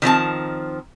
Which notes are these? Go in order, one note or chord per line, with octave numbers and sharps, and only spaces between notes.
D#3 F3 C4 A5